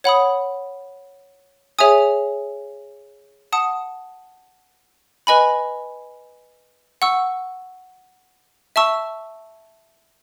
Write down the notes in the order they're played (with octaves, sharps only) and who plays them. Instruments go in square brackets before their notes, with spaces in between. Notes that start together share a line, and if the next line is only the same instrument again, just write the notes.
[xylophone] C#5 F#5 B5 D#6
G#4 C#5 E5 G#5 D#6
F#5 A5 D#6
B4 D#5 G#5 B5
F#5 C#6 E6
E5 A5 C#6 E6